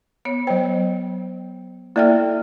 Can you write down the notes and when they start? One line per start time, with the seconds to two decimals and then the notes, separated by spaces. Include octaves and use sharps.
0.25 B3 C#5
0.47 F#3 C5 G5
1.96 A#3 E4 A4 D5 E5 G5 F6